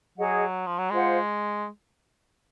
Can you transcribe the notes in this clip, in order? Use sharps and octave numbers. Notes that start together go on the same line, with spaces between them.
F#3 G#4 D#5 F#5
F3
F#3
G#3 F4 C5 F#5